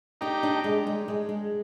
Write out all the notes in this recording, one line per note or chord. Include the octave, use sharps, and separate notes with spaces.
D4 D#4 G4
D4
G#3
G#3
G#3
G#3